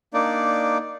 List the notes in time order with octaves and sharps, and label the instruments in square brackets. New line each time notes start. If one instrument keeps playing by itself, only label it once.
[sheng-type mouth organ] A#3 D4 D#4 D5